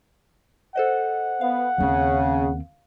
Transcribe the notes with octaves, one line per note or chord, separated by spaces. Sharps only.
A4 C5 D#5 F#5
B3 F5
D#2 C#3 C4